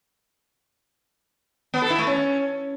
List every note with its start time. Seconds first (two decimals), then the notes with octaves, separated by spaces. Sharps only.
1.74 B3
1.82 A4
1.90 E4
1.99 A3
2.07 C#4